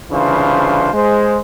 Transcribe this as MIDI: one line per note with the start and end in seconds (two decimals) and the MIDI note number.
0.11 0.89 36
0.11 0.89 49
0.11 0.89 52
0.11 0.89 62
0.11 0.89 65
0.11 0.89 72
0.94 1.39 56
0.94 1.39 72